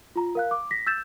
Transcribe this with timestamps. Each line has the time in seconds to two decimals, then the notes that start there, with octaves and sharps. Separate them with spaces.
0.16 F4 A#5
0.35 A#4 F5 F#6
0.51 D6
0.71 A#6 B6
0.87 E6 G6 A6 E7